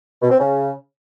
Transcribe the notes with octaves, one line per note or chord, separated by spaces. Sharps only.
B2
C4
C#3